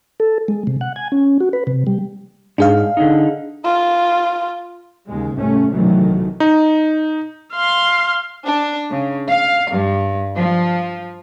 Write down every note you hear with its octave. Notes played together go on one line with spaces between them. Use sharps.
A4
G#3
C3
F#5
G#5
C#4
F#4
B4
C3
G3
G#2 D4 G#4 F5
D3 D#4
F4
D#2 C#3 G#3
C2 G#2 A3 C#4
B1 C3 D#3 E3 F#3 A3
D#4
F5 C6
D4
C#3
F5
G2
F3